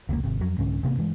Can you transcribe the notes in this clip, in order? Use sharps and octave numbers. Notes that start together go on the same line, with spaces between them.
F1 C#2 G#2 A#3
G#1 C3
F2 F#3
C2 G#2 D3 C#4
A1 C3 A#3 B3
G2 E3 G#3